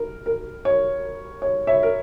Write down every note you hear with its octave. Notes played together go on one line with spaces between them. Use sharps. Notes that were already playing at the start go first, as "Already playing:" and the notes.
Already playing: A#4
A#4
C#5
C#5
C#5 E5
A#4